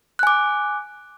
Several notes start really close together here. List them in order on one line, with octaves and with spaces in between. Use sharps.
F#6 G#5 D6